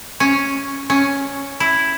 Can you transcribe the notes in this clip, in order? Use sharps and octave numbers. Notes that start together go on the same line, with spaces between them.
C#4
C#4
E4